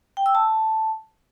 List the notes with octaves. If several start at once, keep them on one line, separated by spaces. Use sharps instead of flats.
G5
E6
A5